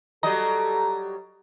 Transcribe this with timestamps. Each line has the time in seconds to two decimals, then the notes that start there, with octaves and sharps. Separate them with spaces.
0.23 F#3 G3 A4 D#5 A#5